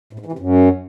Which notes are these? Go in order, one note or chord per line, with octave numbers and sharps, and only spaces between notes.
A2
G#2
E3
C3
F#2